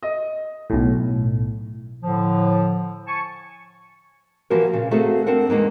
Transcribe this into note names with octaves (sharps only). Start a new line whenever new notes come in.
D#5
B1 A2
A2 D3 F3
G#5 A5 C#6
E3 F3 A#3 F#4 G4 A#4
A#2 C#3
A3 A#3 C4 F#4 G#4 A4
C4 D4 A#4 F#5
E2 G#3 A#3 B3 D#4